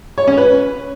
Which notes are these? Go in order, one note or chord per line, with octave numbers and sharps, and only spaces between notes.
C#5
C#4
B4